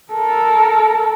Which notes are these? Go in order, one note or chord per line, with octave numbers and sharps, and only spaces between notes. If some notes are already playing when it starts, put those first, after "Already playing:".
A4 A#4